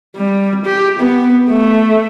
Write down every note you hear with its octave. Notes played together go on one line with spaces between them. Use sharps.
G3
G4
B3
A3